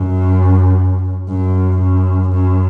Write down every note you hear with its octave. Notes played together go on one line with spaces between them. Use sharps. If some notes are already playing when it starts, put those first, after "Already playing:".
Already playing: F#2
F#2
F#2
F#2